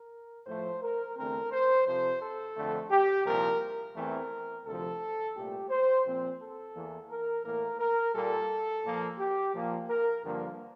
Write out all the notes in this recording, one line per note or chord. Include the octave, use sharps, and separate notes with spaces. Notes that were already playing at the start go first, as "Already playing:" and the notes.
Already playing: A#4
A2 F3 A3 C5
A#4
E2 D3 A3 C4 A#4
C5
F2 C3 F3 C5
A4
F2 D3 A3
G4
C2 A#2 F3 A#4
E2 E3 A3 C4 A#4
D2 C3 F3 A4
C2 A#2 A3 G4
C5
A#2 F3 C4
A4
E2 E3 A#3
A#4
A2 E3 A#3 A#4
A#4
A#2 G3 A#3 A4
A#2 F3 A#3
G4
A#2 F3 A#3
A#4
G2 D3 F3 A#3